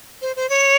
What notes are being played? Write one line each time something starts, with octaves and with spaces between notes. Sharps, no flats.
C5
C5
C#5